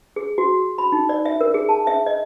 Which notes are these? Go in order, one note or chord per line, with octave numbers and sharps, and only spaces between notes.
G#4
F#4
B5
D#4
D5
E5
A#4
G#4
A5
E5
D#5